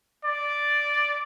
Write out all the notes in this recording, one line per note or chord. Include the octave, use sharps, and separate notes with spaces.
D5